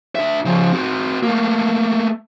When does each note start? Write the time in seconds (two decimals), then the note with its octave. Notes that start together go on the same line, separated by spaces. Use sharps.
0.15 D4 E5
0.45 C#3 F3
0.72 C4 F#4
1.23 A3 A#3